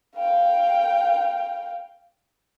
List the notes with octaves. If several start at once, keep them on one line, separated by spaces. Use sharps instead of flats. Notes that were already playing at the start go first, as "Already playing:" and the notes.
F5 G5